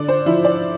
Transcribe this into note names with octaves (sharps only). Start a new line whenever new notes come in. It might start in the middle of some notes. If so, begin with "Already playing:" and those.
Already playing: D3 D5
C5
F3 E4
D5